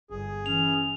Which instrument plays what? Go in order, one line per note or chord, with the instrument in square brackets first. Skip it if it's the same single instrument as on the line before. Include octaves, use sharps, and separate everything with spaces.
[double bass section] G1 [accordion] G#4
[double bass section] E3 [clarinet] C#4 [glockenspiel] F7